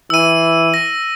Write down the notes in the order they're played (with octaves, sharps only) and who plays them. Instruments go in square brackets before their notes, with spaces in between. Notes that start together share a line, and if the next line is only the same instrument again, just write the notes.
[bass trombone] E3 [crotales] E6 D#7
[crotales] A#6